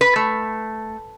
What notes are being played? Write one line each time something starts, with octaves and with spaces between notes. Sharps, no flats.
B4
A3